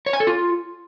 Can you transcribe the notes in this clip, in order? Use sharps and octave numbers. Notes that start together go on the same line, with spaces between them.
C#5
G#5
A4
F4